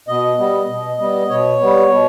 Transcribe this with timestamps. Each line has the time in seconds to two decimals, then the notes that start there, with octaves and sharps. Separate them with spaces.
0.08 B2 D#5
0.38 G3 B3
0.68 B2
0.99 G3 B3
1.29 B2 C#5
1.60 G3 B3
1.90 B2